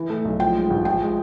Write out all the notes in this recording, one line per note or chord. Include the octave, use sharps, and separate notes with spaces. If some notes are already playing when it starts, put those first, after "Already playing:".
Already playing: E3
A3
B1
F3 G5
G#3
A1
F3 G5
G#3